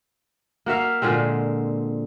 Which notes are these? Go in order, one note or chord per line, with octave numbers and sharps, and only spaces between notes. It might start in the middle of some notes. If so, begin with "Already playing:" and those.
A#3 F#4 E5 F5
A#2 D3 G#3 C4